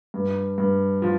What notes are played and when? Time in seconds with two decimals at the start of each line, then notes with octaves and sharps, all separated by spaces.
0.14 G2
0.58 G2
1.02 F3